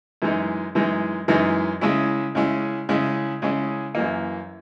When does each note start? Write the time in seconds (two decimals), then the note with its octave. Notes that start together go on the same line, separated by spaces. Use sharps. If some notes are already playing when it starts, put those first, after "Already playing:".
0.22 F#2 E3 G#3 D#4
0.75 F#2 E3 G#3 D#4
1.28 F#2 E3 G#3 D#4
1.81 C#3 G#3 C#4 E4
2.35 C#3 G#3 C#4 E4
2.89 C#3 G#3 C#4 E4
3.42 C#3 G#3 C#4 E4
3.95 F#2 E3 A#3